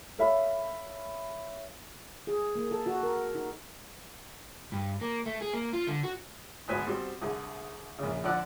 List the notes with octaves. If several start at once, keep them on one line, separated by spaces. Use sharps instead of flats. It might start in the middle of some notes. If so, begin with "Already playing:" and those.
A4 C#5 E5 F5 B5
G#4
A#3
A4
F#4
A#4
D#4
G2
A#3
A3
G#4
A#3
F4
D3
F#4
G#1 D2 B3 B4 C5 G#5
B2 G3 C4 C5
C2 D3 G#4
A#1 C#3
D3 F3 D5 F#5 E6